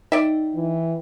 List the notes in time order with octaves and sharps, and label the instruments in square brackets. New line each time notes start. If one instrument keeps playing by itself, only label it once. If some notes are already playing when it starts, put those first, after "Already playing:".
[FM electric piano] D#4 [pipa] D5 E5 [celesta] G5
[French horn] E3